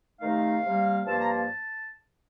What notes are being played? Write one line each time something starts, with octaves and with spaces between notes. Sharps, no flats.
C3 D#3 A3 D#4 F5
C3 G3 A#3
G2 F3 A#3 A5
A#5
A5